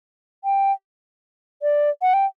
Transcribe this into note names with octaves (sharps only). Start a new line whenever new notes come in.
G5
D5
F#5
G5